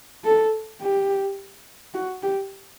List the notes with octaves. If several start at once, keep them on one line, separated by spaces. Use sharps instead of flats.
A4
G4
F#4
G4